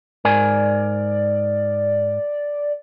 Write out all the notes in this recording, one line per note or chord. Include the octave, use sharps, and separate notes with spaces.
G#2 A#4 D5 G#5